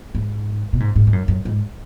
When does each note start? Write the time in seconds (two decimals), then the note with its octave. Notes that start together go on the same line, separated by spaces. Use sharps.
0.15 G#2
0.73 B2
0.80 G#2
0.96 G#2
1.07 G#2
1.13 F#2
1.28 F#2
1.45 G#2